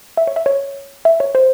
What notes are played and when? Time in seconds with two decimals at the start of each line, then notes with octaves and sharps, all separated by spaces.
0.17 E5
0.27 C#5
0.36 E5
0.46 C#5
1.05 E5
1.20 C#5
1.35 C5